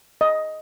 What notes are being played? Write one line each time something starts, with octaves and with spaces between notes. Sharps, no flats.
D#5